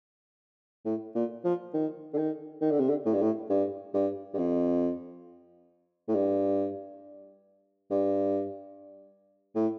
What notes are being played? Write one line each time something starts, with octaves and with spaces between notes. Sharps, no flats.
A2
A#2
F3
D#3
D3
D#3
D#3
D3
C3
D3
A2
G2
A2
G2
G2
G2
F2
A2
G2
G2
A2